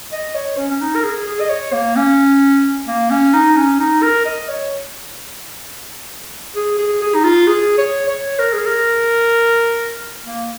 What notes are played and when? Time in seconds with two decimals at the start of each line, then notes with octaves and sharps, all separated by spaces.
0.12 D#5
0.35 C#5
0.58 C#4
0.70 C#4
0.81 D#4
0.96 A#4
1.04 G#4
1.27 G#4
1.40 D#5
1.50 C#5
1.73 A#3
1.96 C#4
2.88 A#3
3.10 C#4
3.34 D#4
3.56 C#4
3.80 D#4
4.03 A#4
4.26 D#5
4.49 C#5
6.56 G#4
6.79 G#4
7.02 G#4
7.15 D#4
7.24 F4
7.47 G#4
7.78 C#5
8.09 C#5
8.39 A#4
8.53 G#4
8.66 A#4
10.23 A#3